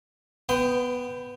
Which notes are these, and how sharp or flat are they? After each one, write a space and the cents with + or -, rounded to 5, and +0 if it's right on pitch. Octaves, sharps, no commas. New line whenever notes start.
B3 +5 G5 +0 B5 +45